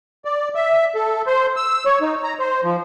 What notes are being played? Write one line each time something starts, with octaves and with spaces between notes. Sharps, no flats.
D5
E5
A4
C5
E6
C#5
D#4
A#5
C5
F3